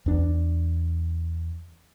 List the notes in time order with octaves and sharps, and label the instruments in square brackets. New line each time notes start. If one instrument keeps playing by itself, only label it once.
[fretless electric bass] E2 D4